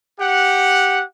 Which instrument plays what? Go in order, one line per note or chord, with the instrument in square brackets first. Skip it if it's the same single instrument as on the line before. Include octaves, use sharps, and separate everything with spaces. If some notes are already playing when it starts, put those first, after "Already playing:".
[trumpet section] G4 F#5